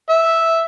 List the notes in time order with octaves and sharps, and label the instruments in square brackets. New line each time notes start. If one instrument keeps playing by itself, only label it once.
[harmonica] E5